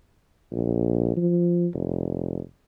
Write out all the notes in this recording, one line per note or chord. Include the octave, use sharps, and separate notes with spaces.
A#1
F3
F1